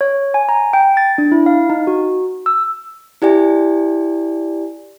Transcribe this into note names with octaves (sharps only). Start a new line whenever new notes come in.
C#5
G#5
A#5
G5
A6
D4
E4
F5
D#4
F#4
E6
E4 G4 D5 G#5